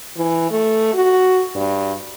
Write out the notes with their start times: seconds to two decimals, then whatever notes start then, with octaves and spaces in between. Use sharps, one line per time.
0.17 E3
0.51 A3
0.94 F#4
1.56 G2